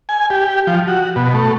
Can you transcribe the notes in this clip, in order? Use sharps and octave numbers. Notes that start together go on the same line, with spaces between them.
G#5
G4
F3
F#4
B2
A3